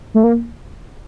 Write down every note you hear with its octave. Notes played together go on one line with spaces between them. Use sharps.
A3
A#3